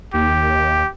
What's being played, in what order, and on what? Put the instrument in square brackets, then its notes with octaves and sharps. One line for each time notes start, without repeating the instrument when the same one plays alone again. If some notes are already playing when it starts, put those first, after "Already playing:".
[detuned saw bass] D#2 [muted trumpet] G4